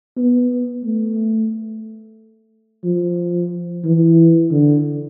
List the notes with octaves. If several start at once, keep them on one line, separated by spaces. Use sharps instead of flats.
B3
A3
F3
E3
D3